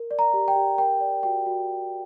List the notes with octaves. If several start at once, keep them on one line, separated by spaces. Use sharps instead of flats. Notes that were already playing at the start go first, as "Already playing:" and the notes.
Already playing: A#4
D5
A#5
G4
G5
G4
A#4 G5
D5
F#4 G5
F#4